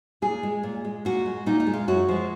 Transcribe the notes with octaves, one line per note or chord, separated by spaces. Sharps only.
A#2 G#4
G#3
A#2
G#3
A#2 F#4
G#3
A#2 D#4
D#4
G#3
F4
F#2 F#4
F3 G#3